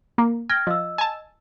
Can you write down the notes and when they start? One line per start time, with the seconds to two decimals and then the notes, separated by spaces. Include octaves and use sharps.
0.18 A#3
0.49 G5 F6 G#6 A#6
0.67 F3 D#5 E6
0.98 G#5 A5